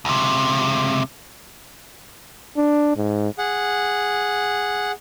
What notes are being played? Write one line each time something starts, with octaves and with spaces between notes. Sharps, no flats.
C#2 C3
D4
G#2
G#4 F#5